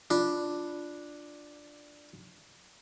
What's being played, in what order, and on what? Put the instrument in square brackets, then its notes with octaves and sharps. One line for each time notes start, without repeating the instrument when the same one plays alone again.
[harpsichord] D4 [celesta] F4